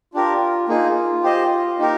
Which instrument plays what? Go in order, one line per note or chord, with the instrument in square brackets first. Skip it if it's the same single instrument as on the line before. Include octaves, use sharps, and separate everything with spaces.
[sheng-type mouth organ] D4 G4 A#4 [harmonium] F4
[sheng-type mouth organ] A#3 D#4 G#4 [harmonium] F4
[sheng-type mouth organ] G4 C5 D#5
[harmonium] A#3 [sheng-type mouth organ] D#4 G4 A#4